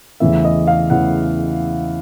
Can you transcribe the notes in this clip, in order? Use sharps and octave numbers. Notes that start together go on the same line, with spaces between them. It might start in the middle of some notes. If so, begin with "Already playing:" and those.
E2 C#3 E3 A3 E5
D#5
F5
E2 C#3 E3 A3 F#5